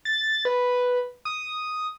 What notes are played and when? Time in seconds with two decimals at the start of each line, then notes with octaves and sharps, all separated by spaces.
0.05 A6
0.45 B4
1.25 D#6